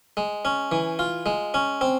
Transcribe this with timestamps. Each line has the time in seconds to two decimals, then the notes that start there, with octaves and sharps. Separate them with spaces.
0.17 G#3
0.45 C#4
0.72 E3
0.99 F4
1.26 G#3
1.54 C#4
1.81 C4